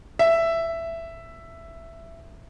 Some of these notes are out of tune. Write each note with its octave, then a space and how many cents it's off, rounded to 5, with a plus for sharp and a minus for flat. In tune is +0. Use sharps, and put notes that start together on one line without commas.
E5 +10